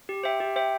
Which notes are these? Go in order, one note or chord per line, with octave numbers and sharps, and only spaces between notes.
G4
C5 E5 G5
G4
C5 E5 G5